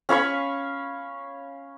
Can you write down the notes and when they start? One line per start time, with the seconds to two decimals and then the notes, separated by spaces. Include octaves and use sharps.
0.09 C#4 F5 B5 C#6